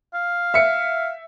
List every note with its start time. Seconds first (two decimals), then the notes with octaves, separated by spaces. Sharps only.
0.14 F5
0.54 E5 C#7